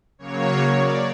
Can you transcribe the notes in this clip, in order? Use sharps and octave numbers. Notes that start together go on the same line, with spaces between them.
C#3 F#3 A#3 C#5
D5